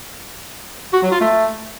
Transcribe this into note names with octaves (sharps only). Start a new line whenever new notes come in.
F#4
F#3
F4
A3